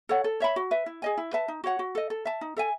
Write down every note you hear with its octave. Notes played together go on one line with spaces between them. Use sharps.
A4 C#5 F#5
A4
C#5 E5 B5
F#4
B4 E5
E4
G#4 D#5 G#5
E4
B4 E5 A5
D#4
F#4 C#5 F#5
F#4
A4 D#5
A4
E5 A5
D#4
A4 E5 G#5